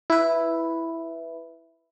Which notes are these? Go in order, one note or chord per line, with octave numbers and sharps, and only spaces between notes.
E4 B4